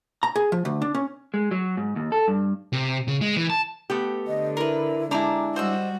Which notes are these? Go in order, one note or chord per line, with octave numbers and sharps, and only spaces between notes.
A#5
G#4
F3
D2
D4
C#4
G#3
F#3
G#2
D#2
A4
G2
C3
C#3
G#3
E3
A5
A3 B3 G4
D3 D#5
E4 A#4 B4
G#3 D4 E4 G4 A#5 D6
G3 F#4 C5 D#5 E6